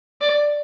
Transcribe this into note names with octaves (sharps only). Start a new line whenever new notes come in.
D5